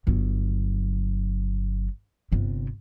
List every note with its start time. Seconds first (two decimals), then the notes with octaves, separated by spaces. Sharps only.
0.07 G1 F#3
2.32 G1 C3